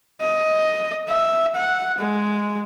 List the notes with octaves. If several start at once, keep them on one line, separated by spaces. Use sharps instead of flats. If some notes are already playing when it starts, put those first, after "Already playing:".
D#5
E5
F#5
G#3